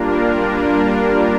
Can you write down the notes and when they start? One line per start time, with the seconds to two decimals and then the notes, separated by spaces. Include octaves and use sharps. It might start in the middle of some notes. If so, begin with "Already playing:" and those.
Already playing: G3 A#3 D4 F4 A#4